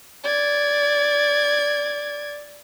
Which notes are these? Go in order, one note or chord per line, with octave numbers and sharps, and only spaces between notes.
D5 G#6